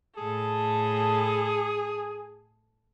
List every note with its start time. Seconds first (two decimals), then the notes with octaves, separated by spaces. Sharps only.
0.17 A2 G#4 A4